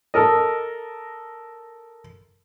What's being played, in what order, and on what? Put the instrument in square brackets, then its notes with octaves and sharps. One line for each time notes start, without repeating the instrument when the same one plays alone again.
[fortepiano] A4 A#4 D#5